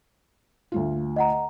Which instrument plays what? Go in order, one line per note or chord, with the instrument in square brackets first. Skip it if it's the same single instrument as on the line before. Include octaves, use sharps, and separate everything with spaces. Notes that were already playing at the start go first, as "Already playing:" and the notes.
[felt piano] D2 A3 F4
[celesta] D#5 F#5 A#5